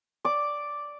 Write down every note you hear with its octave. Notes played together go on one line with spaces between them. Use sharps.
D5 D6